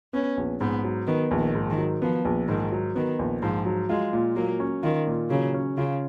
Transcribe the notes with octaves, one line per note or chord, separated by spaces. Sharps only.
B3 C#4
A#1
G#2 B3
F#3
D#3 B3
A#1
D#3
G#2
D#3
F#3
F3 B3
A#1
G#2 D#3
F#3
D#3 B3
A#1
G#2 F3
F#3
G#3 F4
A#2
F#3 A#3
C#4
D#3 F4
A#2
C#3 F#3
C#4
C#3 F4